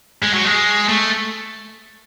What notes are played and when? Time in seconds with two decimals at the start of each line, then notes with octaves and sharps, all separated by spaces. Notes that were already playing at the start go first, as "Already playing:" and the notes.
0.23 G#3
0.34 F#3
0.45 G#3
0.89 A3